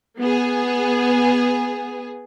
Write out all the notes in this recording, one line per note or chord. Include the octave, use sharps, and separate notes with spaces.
B3 G#4